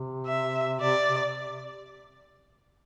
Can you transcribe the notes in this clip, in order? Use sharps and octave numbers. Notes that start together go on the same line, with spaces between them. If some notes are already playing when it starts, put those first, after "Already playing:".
Already playing: C3
E5
C3 D5
C3